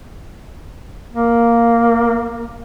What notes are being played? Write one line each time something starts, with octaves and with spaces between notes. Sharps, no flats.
A#3